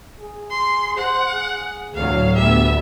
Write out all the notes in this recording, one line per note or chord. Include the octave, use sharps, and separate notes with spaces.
G#4
C6
C5 F#5
G#4
D2 A2 F#3 F5
D2 B3 G4 E5